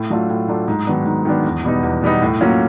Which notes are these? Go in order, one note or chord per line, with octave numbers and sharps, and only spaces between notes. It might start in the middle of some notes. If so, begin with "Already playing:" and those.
Already playing: A2
F#3 A3 D4 F4
A2
F#3 A3 D4 F4
G#2
D#3 F#3 B3 D4
G#2
D#3 F#3 B3 D4
E2
B2 G3 B3 D#4
E2
B2 G3 B3 D#4
A2
F#3 A#3 C#4 F4